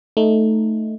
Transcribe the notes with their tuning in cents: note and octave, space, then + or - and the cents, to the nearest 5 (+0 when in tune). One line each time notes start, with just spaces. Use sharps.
A3 +0 D#4 +0